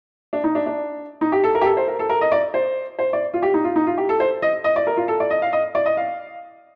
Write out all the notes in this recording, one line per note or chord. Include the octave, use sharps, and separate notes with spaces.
D4
D#4
D4
D4
D#4
G4
A4
A#4
G4
A4
C5
A#4
A4
A#4
D#5
D5
C5
C5
D5
F4
G4
D#4
F4
D#4
F4
G4
A4
C5
D#5
D#5
D5
A#4
F4
A4
D5
D#5
F5
D#5
D5
D#5
F5